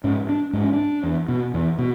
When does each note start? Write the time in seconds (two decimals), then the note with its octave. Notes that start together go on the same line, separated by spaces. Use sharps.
0.04 G#2 C#4
0.29 D4
0.53 G#2 D4
0.64 C#4
0.73 D4
1.03 E2
1.28 B2
1.54 E2
1.79 B2